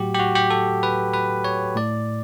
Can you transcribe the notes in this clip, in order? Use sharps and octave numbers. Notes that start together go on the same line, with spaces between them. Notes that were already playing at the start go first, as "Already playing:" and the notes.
Already playing: A2 F#3 F#4 G4
G4
F#4
G4
A4
B4
B4
C#5
A2 D5